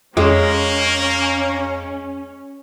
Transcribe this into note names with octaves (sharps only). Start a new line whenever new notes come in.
F2 G#3 A#3 C#4